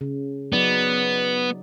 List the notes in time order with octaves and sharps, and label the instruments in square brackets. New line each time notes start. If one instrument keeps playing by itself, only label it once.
[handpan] C#3
[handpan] F#3 D#4 D5 [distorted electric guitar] B3